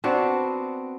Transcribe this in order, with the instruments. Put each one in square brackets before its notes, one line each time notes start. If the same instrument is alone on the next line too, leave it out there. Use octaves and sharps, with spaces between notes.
[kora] B3 C4 D4 F#4